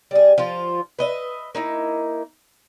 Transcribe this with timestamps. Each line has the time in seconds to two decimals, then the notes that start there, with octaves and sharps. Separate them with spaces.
0.11 G3 G#4
0.38 F3 F4
0.99 B4 D#5 E5
1.55 A#3 D#4 E4